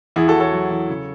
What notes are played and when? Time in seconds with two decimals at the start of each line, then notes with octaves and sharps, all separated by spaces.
0.16 E2 E4 G#4
0.28 F#4 A4
0.34 E2
0.40 A4 C#5
0.52 F#3
0.71 E2
0.90 C#3